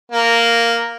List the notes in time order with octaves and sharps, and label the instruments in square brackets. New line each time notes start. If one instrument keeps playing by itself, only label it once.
[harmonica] A#3